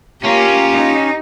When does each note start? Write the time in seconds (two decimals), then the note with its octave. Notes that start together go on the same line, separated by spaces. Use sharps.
0.25 A#3 C#4 F4 G4 A#5
0.71 D#4